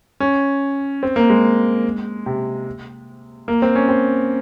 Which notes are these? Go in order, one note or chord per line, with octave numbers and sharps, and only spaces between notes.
C#4
C4
A#3
G#3
C3
A#3
C4
C#4
C4